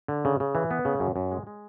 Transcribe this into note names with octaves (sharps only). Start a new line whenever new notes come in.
D3
C#3
C#3
E3
B3
C#3
F#2
F#2
G#3
G#3